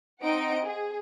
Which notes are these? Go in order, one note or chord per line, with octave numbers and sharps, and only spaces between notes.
C4 D#4 D#5 F#5 D7
G#4